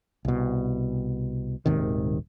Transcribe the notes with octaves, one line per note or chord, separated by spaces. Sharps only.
C2 B2
D#1 G#1 C3 D#3